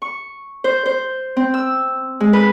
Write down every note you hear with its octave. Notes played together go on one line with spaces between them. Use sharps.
C#6
C5
C5
C4
E6
G#3
B4